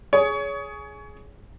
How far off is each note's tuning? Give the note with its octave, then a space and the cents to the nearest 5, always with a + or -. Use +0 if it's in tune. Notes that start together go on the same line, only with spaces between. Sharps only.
G#4 +10 C#5 +25